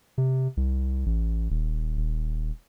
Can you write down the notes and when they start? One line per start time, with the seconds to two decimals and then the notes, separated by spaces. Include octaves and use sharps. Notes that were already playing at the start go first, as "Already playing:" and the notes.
0.18 C3
0.57 C2
1.06 A1
1.50 D#1
1.97 D#1